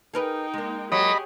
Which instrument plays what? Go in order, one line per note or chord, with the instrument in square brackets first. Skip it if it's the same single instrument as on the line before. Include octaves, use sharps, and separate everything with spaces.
[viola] D#4 G5 [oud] G#4 A#4 B4
[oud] G#3 A#3
[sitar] F#3 [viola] G4 G#4 [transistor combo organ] D#5 B5